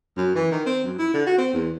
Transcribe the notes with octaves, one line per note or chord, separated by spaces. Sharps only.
F#2
E3
D#3
C4
F#2
E4
D3
F#4
C4
E2